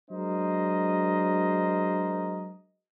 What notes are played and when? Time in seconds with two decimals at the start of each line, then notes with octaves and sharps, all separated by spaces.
0.11 F#3 G#3 D4 A#4 C5 D#5